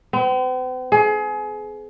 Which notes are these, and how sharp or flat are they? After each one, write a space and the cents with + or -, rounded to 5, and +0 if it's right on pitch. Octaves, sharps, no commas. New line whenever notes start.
C4 -45
G#4 +30